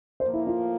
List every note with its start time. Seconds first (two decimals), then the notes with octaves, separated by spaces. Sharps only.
0.20 A2 F3 A#3 C5
0.33 E4
0.47 F4